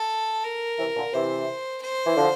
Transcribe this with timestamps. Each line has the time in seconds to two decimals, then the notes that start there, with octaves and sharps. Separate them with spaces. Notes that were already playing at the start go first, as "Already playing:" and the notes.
Already playing: A4
0.44 A#4
0.79 C3 E3
0.96 A#2 D3
1.13 C3 E3 C5
1.82 C5
2.06 E3
2.16 D3 F3